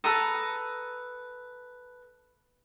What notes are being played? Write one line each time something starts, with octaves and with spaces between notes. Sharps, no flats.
A4 B4 A#5 D#6